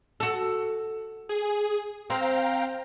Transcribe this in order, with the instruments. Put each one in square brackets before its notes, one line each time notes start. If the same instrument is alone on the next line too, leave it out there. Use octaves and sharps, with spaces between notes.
[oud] F#4 A4
[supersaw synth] G#4
[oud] C4 [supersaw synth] F5 G5 A#5